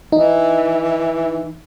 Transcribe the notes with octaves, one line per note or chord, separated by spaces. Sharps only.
E3 D#4